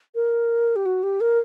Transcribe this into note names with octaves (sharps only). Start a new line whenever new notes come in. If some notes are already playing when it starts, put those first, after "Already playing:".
A#4
G4
F#4
G4
A#4